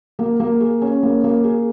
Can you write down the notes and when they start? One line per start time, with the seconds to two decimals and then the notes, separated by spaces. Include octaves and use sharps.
0.19 A#3
0.40 A#3
0.60 G#4
0.82 C#4
1.03 A#3
1.24 A#3
1.44 G#4